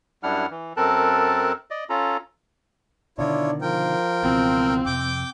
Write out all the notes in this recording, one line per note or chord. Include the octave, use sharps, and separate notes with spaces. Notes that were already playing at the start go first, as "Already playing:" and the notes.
F#2 G3 D4 E4 F#5 F6
E3
F#2 C4 A4 A#4 A5 F#6
D5 D#5
C#4 F4 A4 A#5
B2 D3 D#3 D4 E4 F4 C#5
F3 A#4 G5
C#2 B2 E3 C4
F2 C3 G5 D6 G6